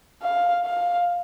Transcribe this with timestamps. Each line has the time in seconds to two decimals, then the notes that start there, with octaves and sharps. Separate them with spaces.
0.23 F5
0.65 F5